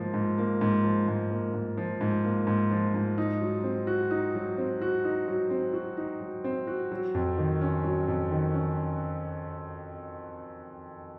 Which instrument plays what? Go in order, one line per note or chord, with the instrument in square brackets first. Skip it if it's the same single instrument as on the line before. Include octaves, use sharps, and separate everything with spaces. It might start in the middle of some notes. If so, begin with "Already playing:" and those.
Already playing: [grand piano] G#2 F3 A#3
G#2
A#3
G#2
F3
G#2
A#3
G#2
F3
G#2
A#3
G#2
F3
G#2
D#4
F#3
C4
F#4
D#4
F#3
C4
F#4
D#4
F#3
C4
F#4
D#4
F#3
C4
F#4
F#3
F2
D#3
C#4
F#3
F2
D#3
C#4